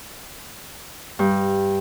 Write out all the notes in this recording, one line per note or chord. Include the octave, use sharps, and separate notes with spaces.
G2